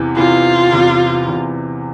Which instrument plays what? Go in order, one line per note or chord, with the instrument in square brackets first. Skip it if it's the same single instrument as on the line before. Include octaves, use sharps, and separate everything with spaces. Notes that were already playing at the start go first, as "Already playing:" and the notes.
Already playing: [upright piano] E2 C3 E3
[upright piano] E2 C3 E3 [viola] F4
[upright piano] E2 C3 E3
E2 C3 E3